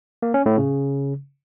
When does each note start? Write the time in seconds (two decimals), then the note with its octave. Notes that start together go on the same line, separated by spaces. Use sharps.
0.22 A#3
0.34 C#4
0.46 A2
0.57 C#3